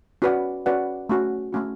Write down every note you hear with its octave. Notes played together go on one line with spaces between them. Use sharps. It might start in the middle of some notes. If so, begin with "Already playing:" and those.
C#4 F#4 B4 D5 F#5
C#4 F#4 B4 D5 F#5
A3 C#4 F#4
A3 C#4 F#4